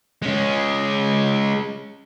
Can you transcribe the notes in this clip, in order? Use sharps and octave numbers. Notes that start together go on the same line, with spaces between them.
G#3 C#4